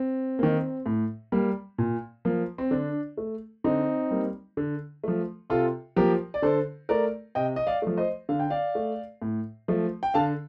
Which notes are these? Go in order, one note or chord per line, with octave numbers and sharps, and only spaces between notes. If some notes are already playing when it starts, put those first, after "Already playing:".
Already playing: C4
D#3 A#3
A2
G3 A#3
A#2
F3 A#3
C4
D3 D4
A3
D3 C4 D#4
G3 A#3
D3
F3 A3
C3 F4 A4
F3 A#3 G4 A#4
D5
D3 A4 C5
A3 A#4 D5
C3 D#5 G5
D#5
D5 F5
F3 A3
C5 D#5
D3 F5
G5
D5 F5
A3
A2
F3 A3
G5
D3 F5 A5